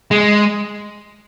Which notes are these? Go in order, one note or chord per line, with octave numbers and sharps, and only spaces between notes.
G#3